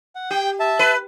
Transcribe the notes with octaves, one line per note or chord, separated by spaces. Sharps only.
F#5
G4 G5 G6
E5 A5
B4